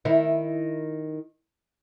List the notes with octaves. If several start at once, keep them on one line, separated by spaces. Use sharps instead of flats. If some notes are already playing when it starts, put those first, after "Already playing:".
D#3 E4